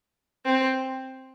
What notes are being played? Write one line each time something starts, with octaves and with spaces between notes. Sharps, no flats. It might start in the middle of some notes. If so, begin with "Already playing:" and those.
C4